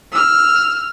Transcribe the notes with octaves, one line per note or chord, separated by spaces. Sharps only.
E6 F6